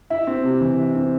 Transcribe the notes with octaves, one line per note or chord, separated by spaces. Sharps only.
E4 E5
C4
C3
E3
E4
C4